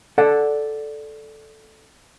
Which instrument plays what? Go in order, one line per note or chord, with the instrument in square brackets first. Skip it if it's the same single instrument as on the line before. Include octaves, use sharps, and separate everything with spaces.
[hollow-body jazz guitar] A4 D5 F#5